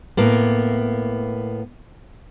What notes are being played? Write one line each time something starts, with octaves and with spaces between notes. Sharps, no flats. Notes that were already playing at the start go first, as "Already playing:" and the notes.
A2 A#3 B3